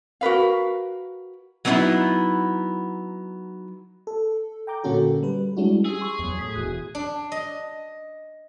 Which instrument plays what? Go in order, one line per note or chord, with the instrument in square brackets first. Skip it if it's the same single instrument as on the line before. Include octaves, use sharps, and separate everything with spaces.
[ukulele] F#4 A#4 B4 F5
[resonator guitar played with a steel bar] F#3 A#3 B3 C#4 D#4 E4
[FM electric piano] A4
G5 A#5 D6 G6
A#2 D3 A#3 C#4 F#4 A4
G3 B4
G3 G#3 C#4 D4 E4 F#4
[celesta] G4 E6 [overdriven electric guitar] G#4
[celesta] C6 C#6
[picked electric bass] E2 F#3
[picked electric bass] A2 [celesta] D#6 B6
[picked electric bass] E1 E2 [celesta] F#4 F#6 D#7
[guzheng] D4
D#5